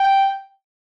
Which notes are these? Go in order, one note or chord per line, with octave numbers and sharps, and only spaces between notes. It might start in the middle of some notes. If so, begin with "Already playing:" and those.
Already playing: G5